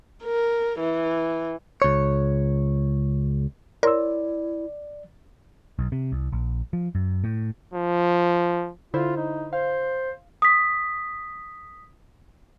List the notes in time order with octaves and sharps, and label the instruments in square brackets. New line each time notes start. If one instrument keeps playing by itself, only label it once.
[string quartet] A#4
E3
[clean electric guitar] C#2 C#5
[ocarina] E4 [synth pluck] A#4 [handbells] C#5 C6 E6 [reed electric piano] D5
[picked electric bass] B1
C3
C2
A#1
F3
F#2
A2
[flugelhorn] F3
[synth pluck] D3 E4 C5 [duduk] F4
[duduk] D#4
[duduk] C5 [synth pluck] F5
[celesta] D#6 B6